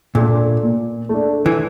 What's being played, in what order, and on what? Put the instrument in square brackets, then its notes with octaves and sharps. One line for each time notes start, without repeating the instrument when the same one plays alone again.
[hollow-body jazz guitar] A#2 [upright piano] A3 D4
[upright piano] A#2
A3 D4
[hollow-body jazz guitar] E3